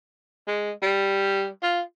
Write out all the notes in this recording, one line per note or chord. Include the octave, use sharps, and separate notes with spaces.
G#3
G3
F4